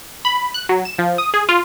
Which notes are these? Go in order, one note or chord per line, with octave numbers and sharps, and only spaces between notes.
B5
F#6
F#3
E7
F3
D#6
G#4
F4